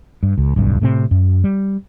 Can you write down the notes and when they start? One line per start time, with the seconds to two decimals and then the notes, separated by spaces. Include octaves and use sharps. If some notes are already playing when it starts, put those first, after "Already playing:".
0.23 G2
0.38 C#2
0.56 D1 B1 G2
0.81 A2 C3 C4
1.11 F#2
1.44 G3